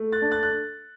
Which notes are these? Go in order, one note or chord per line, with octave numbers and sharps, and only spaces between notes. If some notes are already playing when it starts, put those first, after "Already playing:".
Already playing: A3
F#6 A6
D4
F#6 A6
F#6